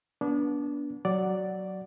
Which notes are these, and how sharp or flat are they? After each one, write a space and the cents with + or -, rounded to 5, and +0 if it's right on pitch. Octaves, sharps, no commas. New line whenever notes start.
B3 -30 D4 -25
F#3 +10 D5 +0 F#5 +0